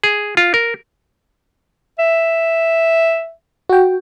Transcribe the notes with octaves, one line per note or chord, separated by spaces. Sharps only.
G#4
F4
A#4
E5
F#4 G5